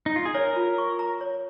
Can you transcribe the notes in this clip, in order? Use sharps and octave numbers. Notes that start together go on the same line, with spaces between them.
D#4
F4
G#4
A#4 C#5
F4
C#6
A#5
C#5